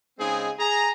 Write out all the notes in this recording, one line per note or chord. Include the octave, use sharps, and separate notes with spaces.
C#3 G#3 C4 D#4 G#4
G#4 A#5